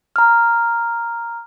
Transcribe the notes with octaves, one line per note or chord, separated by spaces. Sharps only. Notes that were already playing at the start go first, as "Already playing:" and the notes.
A#5 F6